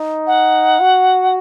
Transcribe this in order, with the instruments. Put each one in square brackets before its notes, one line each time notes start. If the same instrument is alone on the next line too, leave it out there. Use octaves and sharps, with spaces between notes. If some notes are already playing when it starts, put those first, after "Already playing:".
Already playing: [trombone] D#4
[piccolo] F#5
[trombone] F#4